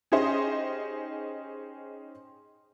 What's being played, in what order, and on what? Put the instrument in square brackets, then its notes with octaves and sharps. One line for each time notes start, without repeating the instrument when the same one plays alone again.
[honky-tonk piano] C#4 D#4 G4 G#4 C5 D#5